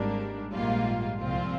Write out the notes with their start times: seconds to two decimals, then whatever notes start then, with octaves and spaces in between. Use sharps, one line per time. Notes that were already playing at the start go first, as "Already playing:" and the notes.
Already playing: G#1 G#2 G3 A#3 D4
0.53 A#1 G#2 G3 A#3 F4
1.20 C2 A#2 F3 C4 F4